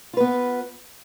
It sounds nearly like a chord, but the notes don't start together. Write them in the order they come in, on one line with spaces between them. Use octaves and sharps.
F4 B4 B3